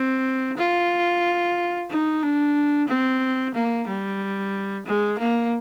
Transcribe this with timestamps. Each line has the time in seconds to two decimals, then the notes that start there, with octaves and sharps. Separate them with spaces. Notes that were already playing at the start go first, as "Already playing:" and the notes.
Already playing: C4
0.58 F4
1.90 D#4
2.23 D4
2.88 C4
3.54 A#3
3.88 G3
4.86 G#3
5.19 A#3